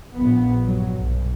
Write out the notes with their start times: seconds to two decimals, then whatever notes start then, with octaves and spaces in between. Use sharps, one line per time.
0.15 A#1 B3
0.65 G2 F#3
0.98 B1